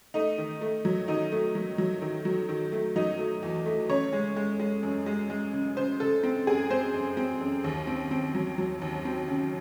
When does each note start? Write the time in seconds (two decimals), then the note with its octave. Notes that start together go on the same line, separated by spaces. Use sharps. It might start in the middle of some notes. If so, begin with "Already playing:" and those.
0.14 A3 D#4
0.38 D#3
0.61 A3
0.85 F#3
1.08 D#3 D#4
1.32 A3
1.55 F#3
1.78 F#3
2.02 D#3
2.25 F#3
2.49 D#3
2.72 A3
2.96 F#3 D#4
3.19 A3
3.43 E2
3.66 A3
3.89 C#3 C#5
4.13 G#3
4.36 G#3
4.60 G#3
4.83 F#2
5.06 G#3
5.30 G#3
5.53 C#3
5.77 C#3 C5
6.00 C#3 A4
6.23 C4
6.47 F#2 G#4
6.70 C4 C5
6.94 F#2
7.17 C4
7.41 F#2
7.64 D#2
7.87 C4
8.11 C4
8.35 F#3
8.58 F#3
8.81 D#2
9.05 C4
9.28 C#3